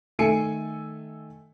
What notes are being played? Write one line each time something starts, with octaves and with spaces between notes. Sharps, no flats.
D#3 A3 A4 G#5 C#7